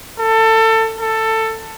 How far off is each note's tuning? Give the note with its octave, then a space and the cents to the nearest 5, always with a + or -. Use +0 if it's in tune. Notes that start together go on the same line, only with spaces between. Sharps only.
A4 +25
A4 +15